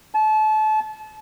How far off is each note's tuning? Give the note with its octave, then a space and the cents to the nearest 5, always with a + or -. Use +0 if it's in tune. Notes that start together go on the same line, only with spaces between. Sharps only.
A5 -30